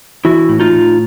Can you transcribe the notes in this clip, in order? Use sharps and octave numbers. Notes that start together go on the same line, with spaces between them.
E3 E4 F#4
A2
D#4 F4
A2